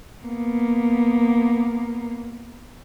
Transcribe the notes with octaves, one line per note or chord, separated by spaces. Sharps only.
A#3 B3